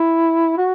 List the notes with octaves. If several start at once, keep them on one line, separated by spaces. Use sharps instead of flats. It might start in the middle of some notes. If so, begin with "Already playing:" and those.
Already playing: E4
F#4